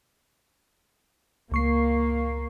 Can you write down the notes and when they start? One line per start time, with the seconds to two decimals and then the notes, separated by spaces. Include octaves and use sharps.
1.52 C#2 A#3 C#6 C7